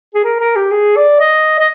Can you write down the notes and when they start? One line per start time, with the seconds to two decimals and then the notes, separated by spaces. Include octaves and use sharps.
0.14 G#4
0.24 A#4
0.40 A#4
0.56 G4
0.71 G#4
0.96 D5
1.20 D#5
1.59 D#5